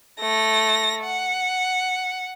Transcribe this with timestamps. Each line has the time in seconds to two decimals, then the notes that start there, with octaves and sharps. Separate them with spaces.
0.21 A3 A#6
1.04 F#5